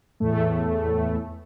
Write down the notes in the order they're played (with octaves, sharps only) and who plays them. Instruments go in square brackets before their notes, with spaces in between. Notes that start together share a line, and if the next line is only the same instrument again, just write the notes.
[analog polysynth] E2 A2 A3